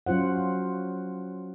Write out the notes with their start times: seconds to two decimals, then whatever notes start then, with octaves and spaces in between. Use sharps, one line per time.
0.06 F#3 C#4 F4 C5 F#5